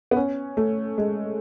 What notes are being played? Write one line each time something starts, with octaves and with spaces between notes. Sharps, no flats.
B3
C#4
A3
G#3